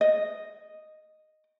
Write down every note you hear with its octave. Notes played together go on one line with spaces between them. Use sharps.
D#5